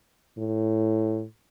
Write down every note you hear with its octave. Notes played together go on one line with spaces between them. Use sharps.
A2